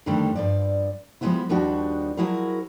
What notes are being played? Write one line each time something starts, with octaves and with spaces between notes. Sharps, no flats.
F2 D3 D#3 G3 A3 D4
G2 F3 D5
F3 G3 G#3 A#3 B3 E4
D#2 F3 G3 D4 D#4 F#4
F3 F#3 E4 F#4 G#4 A#4